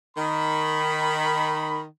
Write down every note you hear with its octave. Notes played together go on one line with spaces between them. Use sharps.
D#3 B5